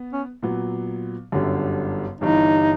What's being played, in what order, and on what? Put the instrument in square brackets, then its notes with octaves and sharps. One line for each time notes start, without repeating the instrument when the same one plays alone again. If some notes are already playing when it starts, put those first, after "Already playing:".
Already playing: [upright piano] B3
[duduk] C#4
[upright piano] A#2 F#3 B3
G1 F#2 D3 G3
[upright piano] G1 G2 E3 [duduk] D#4